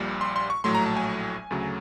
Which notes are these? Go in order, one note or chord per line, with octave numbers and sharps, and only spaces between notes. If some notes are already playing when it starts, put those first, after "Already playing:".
Already playing: A#1 A#2 G3
C6
C6
C#6
A#1 A2 F#3 A3 C6
A#5
A5
G#5
D2 C#3 F#3 A3